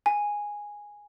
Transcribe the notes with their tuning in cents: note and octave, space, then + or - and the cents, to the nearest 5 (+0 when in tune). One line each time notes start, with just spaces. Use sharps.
G#5 -5